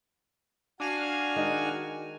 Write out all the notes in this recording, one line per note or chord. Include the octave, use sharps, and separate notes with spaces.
D4 F#4 F5 G#5 F6
D#3 G#3 D#4